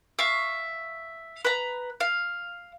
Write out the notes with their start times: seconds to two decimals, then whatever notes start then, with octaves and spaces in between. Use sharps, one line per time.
0.19 E5 F5 C#6
1.45 B4 A#5
2.00 F5